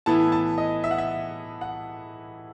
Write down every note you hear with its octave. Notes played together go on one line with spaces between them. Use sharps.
A2 E3 B3 E4 A5
A5
D#5
E5
F#5
E5
F#5